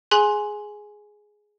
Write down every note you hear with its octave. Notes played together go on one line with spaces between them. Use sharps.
G#4 G#5 C6 F#6 F#7